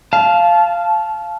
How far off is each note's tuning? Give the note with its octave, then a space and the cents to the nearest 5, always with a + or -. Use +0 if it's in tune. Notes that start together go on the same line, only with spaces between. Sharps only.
F5 -10 A5 -20